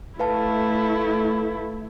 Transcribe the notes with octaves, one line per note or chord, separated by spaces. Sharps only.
A3 E4 B4 F5 A5